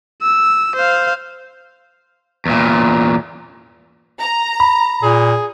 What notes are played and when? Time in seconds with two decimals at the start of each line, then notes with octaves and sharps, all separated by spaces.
0.22 E6
0.76 C5 F5
2.46 E2 A#2
4.22 A#5
4.60 B5
5.03 A#2 G#4